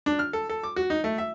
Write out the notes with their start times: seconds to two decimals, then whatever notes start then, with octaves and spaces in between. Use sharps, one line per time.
0.06 D4
0.19 F6
0.33 A4
0.50 A4
0.63 D6
0.76 F#4
0.90 D#4
1.04 A3
1.18 E5